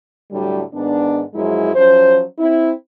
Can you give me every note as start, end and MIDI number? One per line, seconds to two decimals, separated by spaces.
0.31 0.62 45
0.31 0.62 50
0.31 0.62 54
0.31 0.62 55
0.73 1.21 44
0.73 1.21 51
0.73 1.21 59
0.73 1.21 62
1.34 1.72 42
1.34 1.72 53
1.34 1.72 54
1.34 1.72 56
1.34 1.72 64
1.75 2.22 53
1.75 2.22 54
1.75 2.22 61
1.75 2.22 72
2.39 2.72 60
2.39 2.72 64